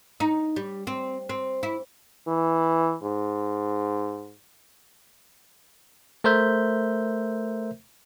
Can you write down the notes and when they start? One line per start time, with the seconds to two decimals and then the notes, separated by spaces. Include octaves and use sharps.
0.20 D#4
0.56 G3
0.87 C4
1.29 C4
1.63 E4
2.28 E3
3.03 G#2
6.24 A3 A#4 C5 E5 G6